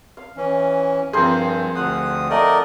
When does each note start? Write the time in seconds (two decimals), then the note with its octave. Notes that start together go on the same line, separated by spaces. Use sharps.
0.17 F5
0.37 E3 C#4
1.13 G2 F3 C4 G#4 A#4 C5
1.75 D2 F5 F#5 D#6
2.31 A3 A#4 D5 D#5